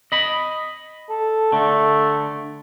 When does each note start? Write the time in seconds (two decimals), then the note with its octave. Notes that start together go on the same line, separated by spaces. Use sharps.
0.12 D#5 B5
1.09 A4
1.52 D3 A3